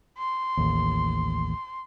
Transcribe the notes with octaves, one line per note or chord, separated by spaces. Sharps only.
C6
A1 D#2